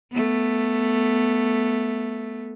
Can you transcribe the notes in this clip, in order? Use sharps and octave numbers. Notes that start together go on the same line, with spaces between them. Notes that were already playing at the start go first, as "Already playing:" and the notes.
A3 B3